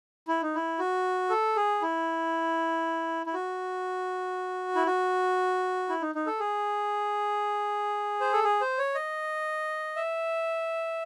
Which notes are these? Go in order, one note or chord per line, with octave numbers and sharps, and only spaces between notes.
E4
D#4
E4
F#4
A4
G#4
E4
E4
F#4
E4
F#4
E4
D#4
D#4
A4
G#4
C5
A4
G#4
C5
C#5
D#5
E5